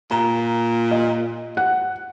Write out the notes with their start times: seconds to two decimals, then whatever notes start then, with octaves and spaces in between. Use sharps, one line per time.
0.11 A#2 A#5
0.91 D#5
1.57 F#5